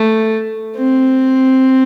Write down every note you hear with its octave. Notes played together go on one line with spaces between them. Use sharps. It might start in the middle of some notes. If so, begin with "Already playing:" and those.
Already playing: A3
C4